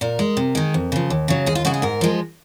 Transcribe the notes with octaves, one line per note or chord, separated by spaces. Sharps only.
A#2 A#4
G#3
C3
D#3 G#3
F2
C#3 F3
D#2
C#3 F#3
D#2 G#4
F4
C#3 G#3 F#4
G#4
G#2 A#4
F3 G#3